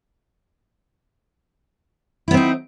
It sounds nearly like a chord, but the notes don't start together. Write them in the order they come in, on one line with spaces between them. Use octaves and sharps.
E4 B3 C4 D#4